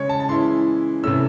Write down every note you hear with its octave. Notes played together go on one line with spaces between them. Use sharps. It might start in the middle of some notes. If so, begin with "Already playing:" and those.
Already playing: C#3 G#3 C#4 C#5
A5
A5
E3 G#3 C#4 E4 C6
C3 E3 A3 C#4 E6